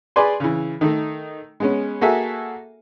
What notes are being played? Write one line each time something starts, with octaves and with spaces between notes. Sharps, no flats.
G#4 B4 D5 G#5 C6
C#3 E3
D#3 A3 D#4
G#3 B3 C#4
A#3 F#4 G#4 A4 E5 G#5